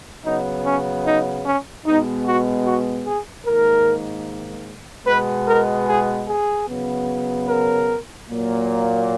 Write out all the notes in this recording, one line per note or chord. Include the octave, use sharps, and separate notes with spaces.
C#3 F#3 B3 D#4
C#4
D#4
C#4
B2 G#3 B3 D#4
F#4
F#4
G#4
G#2 D#3 A#3 A#4
B2 G#3 B3 B4
A#4
G#4
G#4
C#3 F#3 B3
A#4
A#2 F#3 A#3